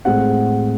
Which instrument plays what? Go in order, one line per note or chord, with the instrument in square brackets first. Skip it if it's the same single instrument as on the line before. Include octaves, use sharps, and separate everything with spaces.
[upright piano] A2 G#3 C4 F#5